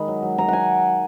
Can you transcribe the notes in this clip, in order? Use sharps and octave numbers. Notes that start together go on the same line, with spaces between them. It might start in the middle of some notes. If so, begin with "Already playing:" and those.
Already playing: D#3 G#3 B5
F#3
F#3
F#3 A#5
F#5 G#5